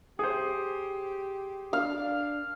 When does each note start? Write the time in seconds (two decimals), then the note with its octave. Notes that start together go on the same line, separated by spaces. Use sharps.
0.19 G4 G#4 C5
1.73 D4 F5